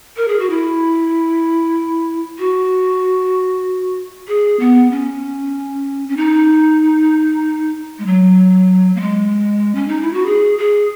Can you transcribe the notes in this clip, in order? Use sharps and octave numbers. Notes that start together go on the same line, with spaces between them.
A#4
G#4
F#4
E4
F#4
G#4
B3
C#4
C#4
D#4
G#3
F#3
A#3
G#3
C#4
D#4
E4
F#4
G#4
G#4